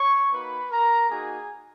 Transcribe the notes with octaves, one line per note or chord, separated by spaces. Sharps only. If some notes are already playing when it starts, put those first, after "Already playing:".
Already playing: C#5 C#6
A#3 D#4 F#4 B4 B5
A#4 A#5
A#3 D#4 F#4 G#4 G#5